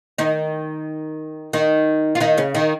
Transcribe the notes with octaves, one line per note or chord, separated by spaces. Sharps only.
D#3 D#4
D#3 D#4
F4
D#3 D#4
C#3 C#4
D#3 D#4